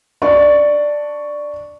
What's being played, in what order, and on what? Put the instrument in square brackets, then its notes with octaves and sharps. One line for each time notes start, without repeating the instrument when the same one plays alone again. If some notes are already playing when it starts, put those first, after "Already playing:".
[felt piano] D4 D5 D#5 C#6